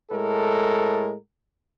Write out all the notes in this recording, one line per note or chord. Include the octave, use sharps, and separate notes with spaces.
A2 G#3 A4 A#4